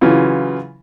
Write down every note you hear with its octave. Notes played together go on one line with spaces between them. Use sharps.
C#3 E3 F#3 F4